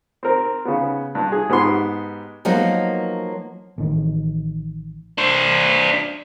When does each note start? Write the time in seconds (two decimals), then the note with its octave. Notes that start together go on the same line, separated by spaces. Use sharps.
0.23 C4 A#4
0.65 C#3 B3
1.15 G2
1.32 G#4
1.49 G#2 B3 G4 C6
2.45 F3 F#3 A#3 B3 D#4 A#4
3.78 A1 D#3
5.18 D4 C5